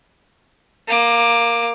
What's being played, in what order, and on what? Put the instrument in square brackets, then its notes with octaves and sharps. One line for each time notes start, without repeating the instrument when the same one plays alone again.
[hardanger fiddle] A#3 D6